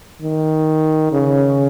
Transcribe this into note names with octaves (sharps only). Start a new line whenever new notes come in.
D#3
C#3